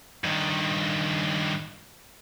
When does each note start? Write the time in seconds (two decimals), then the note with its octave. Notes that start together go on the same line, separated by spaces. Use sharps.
0.24 G2 D#3